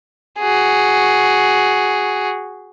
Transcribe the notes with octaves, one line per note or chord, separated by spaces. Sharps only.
F#4 G#4